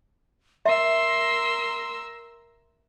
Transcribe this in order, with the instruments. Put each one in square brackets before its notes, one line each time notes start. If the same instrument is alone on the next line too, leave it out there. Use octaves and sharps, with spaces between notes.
[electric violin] A#4 E6 [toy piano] E5 [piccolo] C6